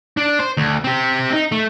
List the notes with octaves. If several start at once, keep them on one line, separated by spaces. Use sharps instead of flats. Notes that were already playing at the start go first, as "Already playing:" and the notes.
D4
C5
D2
C4 G4
D#4
A3